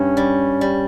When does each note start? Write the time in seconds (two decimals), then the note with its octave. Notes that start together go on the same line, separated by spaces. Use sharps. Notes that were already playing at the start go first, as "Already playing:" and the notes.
Already playing: G2 C#4
0.17 G3
0.61 G3